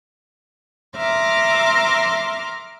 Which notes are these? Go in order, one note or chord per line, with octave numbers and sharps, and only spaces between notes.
E5 A#5 C6 D6 F6